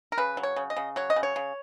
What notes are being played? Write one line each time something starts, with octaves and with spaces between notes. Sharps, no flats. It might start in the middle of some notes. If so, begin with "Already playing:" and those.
A#4
C#3 B4
F#3
C#5
C#3
D#5
C#3
F#3 C#5
D#5
C#3
C#5
C#3